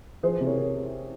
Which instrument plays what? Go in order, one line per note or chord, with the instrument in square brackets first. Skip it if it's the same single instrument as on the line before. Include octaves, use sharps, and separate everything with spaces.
[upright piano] F3 G#4 C5
C3
A#4 C#5